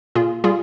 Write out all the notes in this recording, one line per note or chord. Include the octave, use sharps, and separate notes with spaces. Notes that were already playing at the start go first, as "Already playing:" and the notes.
A#2 F4 G#4
G3 F4 G#4